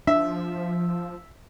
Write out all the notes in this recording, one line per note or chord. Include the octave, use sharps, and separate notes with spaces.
F3 D4 E5